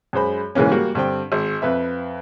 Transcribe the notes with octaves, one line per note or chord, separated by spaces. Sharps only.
F#2 G#3 C5 B5
G#2 C#3 E3 A#3 C#4
G3 A#3 F#4
G2 D3 C4 G5
G#1
F2 B4 E5